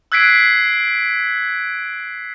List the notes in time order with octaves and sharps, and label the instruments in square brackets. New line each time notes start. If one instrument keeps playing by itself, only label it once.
[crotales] E6 F#6 G#6 B6 C7 D7